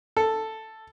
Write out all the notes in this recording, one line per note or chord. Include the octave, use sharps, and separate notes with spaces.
A4